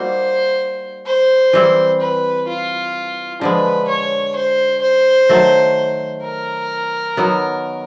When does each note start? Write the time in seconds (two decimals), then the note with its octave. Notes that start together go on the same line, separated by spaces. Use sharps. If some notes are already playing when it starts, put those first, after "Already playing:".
Already playing: G3 A#3 D#4 F#4 C5
1.06 C5
1.53 E3 G3 C4 E4
2.01 B4
2.48 F4
3.41 D3 F3 G#3 B4
3.88 C#5
4.36 C5
4.82 C5
5.29 D#3 F#3 A3
6.23 A#4
7.17 D#3 F#3 B3